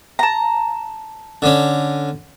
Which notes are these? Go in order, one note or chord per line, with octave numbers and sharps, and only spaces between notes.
A5 A#5
D3 C#4